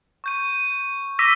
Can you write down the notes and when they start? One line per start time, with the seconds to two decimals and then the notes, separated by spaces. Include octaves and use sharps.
0.24 C#6 G6 D#7
1.19 D6 E6 A#6 B6 D#7